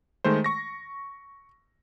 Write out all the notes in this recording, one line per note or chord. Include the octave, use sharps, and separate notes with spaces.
D#3 G#3 A3 C5
C#6 A#6